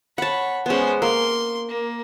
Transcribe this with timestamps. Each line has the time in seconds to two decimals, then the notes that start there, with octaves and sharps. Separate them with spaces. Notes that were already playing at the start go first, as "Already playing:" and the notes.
0.18 C#5 F#5 A5 B5
0.66 G#3 B3 C#4 C5
1.02 A#3 C6
1.69 A#3